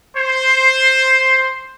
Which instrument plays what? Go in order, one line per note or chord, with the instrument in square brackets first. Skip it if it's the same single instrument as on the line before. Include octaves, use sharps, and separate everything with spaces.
[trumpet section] C5